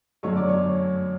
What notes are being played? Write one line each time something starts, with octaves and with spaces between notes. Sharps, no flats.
F#2 D3 F#3 A3 C#5 C#6
D5 D6
C#5 C#6